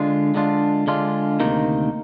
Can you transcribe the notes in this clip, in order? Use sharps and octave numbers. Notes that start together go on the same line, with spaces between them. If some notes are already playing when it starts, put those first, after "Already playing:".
Already playing: D3 G#3 D4 F4
D3 G#3 D4 F4
D3 G#3 D4 F4
D2 C3 D#3 A#3 D#4